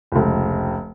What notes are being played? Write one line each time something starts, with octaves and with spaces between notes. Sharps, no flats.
F1 C#2